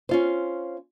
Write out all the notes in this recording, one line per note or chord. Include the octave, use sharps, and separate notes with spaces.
C#4 F4 C5